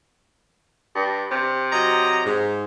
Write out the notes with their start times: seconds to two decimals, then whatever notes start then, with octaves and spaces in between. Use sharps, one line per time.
0.95 G2
1.31 C3
1.72 F#3 D#5 A#5
2.26 G#2